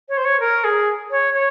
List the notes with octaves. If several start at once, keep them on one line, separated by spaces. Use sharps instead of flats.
C#5
C5
C#5
A#4
G#4
C#5
C#5